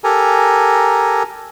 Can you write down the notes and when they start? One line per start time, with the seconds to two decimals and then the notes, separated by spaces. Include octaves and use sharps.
0.04 G4 A4 A#4 G#5 A#5